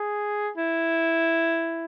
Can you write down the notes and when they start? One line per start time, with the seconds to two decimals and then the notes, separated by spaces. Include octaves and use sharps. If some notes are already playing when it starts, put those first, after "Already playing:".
Already playing: G#4
0.57 E4